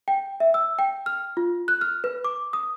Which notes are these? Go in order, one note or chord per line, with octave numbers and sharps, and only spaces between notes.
G5
E5
E6
G5
F6
F4
F#6
F6
B4
D6
D#6